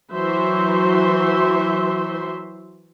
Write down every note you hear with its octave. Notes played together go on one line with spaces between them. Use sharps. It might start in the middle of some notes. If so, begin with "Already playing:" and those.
E3 F#3 C5 E5 C6